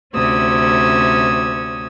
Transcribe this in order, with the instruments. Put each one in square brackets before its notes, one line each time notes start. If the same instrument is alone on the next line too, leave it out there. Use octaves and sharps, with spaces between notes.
[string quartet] D2 C3 C#4 D#6 E6 G#6